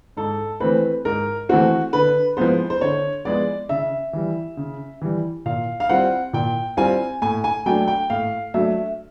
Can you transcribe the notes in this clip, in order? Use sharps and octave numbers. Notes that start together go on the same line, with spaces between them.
G#2 A4
E3 A3 C4 B4
G#2 A#4
E3 A3 C4 F#4
D3 B4
F3 G#3 B3 C5
C5
D3 C#5
F3 G#3 B3 D5
C#3 E5
E3 G3
C#3
E3 G3
A#2 F5
F5
G3 C4 F4 F#5
A#2 G5
G3 C4 F4 G#5
A2 G#5
G#5
F#3 A3 D4 G5
G5
A2 F5
F#3 A3 D4 E5